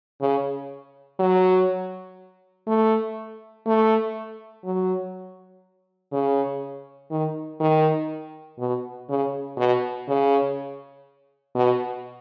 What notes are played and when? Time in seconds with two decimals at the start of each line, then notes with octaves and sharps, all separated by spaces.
0.21 C#3
1.19 F#3
2.67 A3
3.66 A3
4.65 F#3
6.12 C#3
7.11 D#3
7.60 D#3
8.59 B2
9.09 C#3
9.58 B2
10.08 C#3
11.55 B2